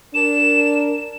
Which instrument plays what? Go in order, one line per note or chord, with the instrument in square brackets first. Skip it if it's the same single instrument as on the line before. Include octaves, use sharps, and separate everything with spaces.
[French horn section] D4 A#4 [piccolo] E7